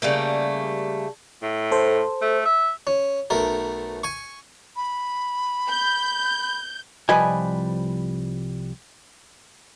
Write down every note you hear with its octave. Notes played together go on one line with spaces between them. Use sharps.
C#3 G3 A3 A#3
A2
A4 C5
A3
E5
C#4
B1 A3 A#4
G#5 C#6
B5
G6
C2 F3 G3 B4 D#5 G#5